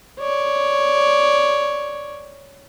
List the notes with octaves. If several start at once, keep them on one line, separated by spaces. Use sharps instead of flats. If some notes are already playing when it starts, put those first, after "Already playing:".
C#5 D5